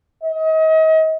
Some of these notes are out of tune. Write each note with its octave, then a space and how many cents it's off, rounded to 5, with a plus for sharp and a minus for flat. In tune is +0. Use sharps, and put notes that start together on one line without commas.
D#5 +35